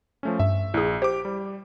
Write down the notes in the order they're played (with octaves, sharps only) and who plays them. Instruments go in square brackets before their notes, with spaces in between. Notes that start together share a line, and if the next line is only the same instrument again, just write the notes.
[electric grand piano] F3 A3 C#4
[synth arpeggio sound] G2 [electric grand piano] E5
[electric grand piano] A#1 [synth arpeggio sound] E4 G#4
[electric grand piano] G4 D6 [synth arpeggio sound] C5
[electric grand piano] G3